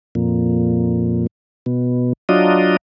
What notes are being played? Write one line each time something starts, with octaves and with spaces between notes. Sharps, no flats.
F2 A#2
B2
F#3 D4 F4 D#5